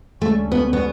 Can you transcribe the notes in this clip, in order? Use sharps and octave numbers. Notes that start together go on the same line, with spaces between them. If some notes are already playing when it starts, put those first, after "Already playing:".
D2 D3 G3 A3 C#4
B3
B3